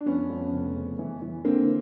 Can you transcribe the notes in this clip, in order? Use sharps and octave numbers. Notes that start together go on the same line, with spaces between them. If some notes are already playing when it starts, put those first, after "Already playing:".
D4
F2 B3 C#4
F2
F1
C#3
E3
E3
D3 A#3 C4